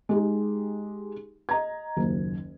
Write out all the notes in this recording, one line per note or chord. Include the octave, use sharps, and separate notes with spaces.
G#3 D#4 G4 G#4
D#5 A#5 G#6
F#1 D#2